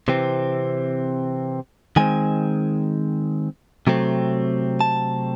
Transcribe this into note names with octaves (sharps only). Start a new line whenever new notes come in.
C3 E3 C4
D#3 G#3 C4 G#5
C3 F#3 A3 C4
A5